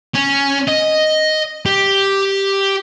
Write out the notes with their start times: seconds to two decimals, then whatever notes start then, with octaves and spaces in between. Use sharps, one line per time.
0.15 C#4
0.68 D#5
1.66 G4